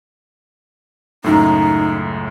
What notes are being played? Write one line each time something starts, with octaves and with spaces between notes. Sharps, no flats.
C#2 F#2 A2 D#4